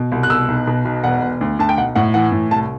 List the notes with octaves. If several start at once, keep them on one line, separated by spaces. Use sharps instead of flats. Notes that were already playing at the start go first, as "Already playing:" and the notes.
Already playing: B2
C2
F#6
B2 E6
B1
B2
B1
E1 F#5
E1
D2
D2 A5
G5
B1 F#5
A2 F#5
E3 F#5
A2
C2 A5